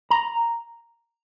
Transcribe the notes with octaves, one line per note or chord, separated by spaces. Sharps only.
A#5